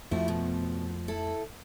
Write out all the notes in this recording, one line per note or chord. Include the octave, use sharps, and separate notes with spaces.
F2 F3 A3 C4 E4 F#4
B2
E4 A4